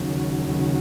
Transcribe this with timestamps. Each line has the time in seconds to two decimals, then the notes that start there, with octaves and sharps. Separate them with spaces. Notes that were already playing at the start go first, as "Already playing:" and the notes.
Already playing: D#2 C#3 F#3
0.48 D#2 C#3 F#3